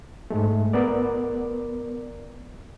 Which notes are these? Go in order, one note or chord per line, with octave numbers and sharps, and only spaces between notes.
G#2 G#3 A3
B3 A#4 D5